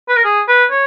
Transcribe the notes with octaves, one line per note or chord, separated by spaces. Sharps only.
B4
A#4
G#4
B4
C#5